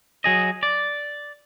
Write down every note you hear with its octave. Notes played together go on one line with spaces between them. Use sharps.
F#3 G#4 D#5
D5